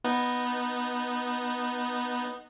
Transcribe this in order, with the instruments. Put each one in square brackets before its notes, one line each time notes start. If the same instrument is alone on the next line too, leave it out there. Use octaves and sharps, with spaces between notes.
[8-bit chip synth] B3 D#4